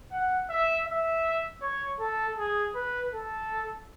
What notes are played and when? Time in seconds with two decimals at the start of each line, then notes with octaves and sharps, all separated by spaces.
0.12 F#5
0.49 E5
0.87 E5
1.62 C#5
2.00 A4
2.38 G#4
2.75 B4
3.13 A4